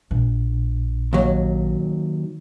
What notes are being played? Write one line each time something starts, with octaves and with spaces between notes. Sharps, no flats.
A#1
D#2 F#3